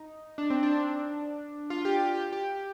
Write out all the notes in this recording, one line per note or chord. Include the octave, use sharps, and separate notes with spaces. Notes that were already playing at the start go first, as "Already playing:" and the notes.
Already playing: D#4
D4
C4
D4
F4
G4
G4
G4
G4